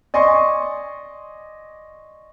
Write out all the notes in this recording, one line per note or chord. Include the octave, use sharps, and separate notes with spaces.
D5 D#5 G#5 C6 C#6